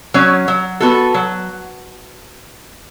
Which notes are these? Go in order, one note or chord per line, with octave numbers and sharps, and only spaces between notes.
F#3 C#4
F#3
B3 F#4 A4
F#3